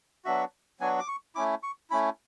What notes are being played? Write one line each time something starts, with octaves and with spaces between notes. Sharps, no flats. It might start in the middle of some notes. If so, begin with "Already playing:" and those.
F#3 B3 D4 F#4 E5
F#3 B3 D4 F#4 G#5
D6
C#6
A3 C#4 E4 D6
C#6
A3 C#4 E4 B5